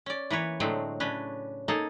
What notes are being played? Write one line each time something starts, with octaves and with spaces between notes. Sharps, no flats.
C#4 D5
E3 A#3 B4 C#5
A2 D3 F#3 G#3 A3 C4
C#3 C#4 D4 B4
A#3 D#4 G#4 A4